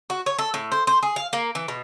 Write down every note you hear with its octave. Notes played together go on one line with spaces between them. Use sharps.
F#4
C#5
A4
A2
C5
C5
G#4
F5
A#3
E3
B2